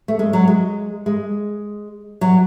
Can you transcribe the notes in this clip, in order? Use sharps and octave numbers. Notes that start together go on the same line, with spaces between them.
A3
G#3
F#3
G#3
G#3
F#3